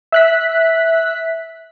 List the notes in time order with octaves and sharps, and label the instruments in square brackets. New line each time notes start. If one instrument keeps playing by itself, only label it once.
[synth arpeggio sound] E5 F#6 B6